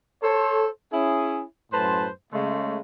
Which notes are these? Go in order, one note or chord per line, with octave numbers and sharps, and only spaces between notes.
A4 C5 C#5
C#4 E4 G#4
F#2 A2 B4 C5 A5 C6
C#3 G#3 A3